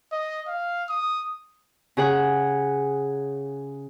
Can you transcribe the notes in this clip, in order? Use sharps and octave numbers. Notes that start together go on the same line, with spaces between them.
D#5
F5
D#6
C#3 G#4 F#5